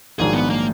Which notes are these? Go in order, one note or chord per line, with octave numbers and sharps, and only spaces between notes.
A#1 G#2 D#3 F#3 D4 G#4
B3
A#3